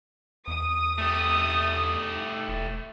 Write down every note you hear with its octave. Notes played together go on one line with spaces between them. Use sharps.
E2 D#6
A3 G4
E1